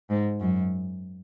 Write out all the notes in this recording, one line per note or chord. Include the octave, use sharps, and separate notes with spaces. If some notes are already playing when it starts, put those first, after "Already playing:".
G#2
F#2